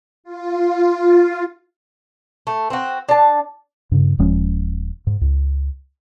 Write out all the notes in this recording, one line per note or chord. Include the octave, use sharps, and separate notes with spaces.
F4
A3
C4 F#4
D4 A5
G2 C#3
D#1 F3 G#3 C#4
G#2
C#2